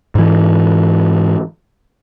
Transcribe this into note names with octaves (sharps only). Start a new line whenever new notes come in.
G#2 E3